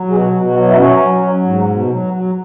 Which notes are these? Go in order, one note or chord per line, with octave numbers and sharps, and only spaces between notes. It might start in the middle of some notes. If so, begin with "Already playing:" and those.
Already playing: F#3
B2 G#4
F#4
B2
F#4
F#3
E4
F#3 C#4
F#3
F#3
G#2
B2
F#3
F#3